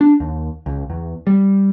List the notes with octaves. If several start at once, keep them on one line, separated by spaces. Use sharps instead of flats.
D4
D#2
C#2
E2
G3